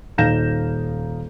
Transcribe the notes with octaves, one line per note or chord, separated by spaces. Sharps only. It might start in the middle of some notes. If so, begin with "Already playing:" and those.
D#1 D#4 F5 G6 A#6 E7